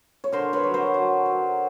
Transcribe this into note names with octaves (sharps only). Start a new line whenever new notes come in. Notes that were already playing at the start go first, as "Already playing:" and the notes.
C#5
D3 A#4 C5
B4 C#5
F#3
A#4 C5
F#3
F#3